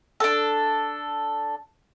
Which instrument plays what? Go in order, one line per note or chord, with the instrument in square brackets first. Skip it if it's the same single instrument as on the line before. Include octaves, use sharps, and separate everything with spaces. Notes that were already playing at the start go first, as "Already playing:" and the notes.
[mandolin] D4 A4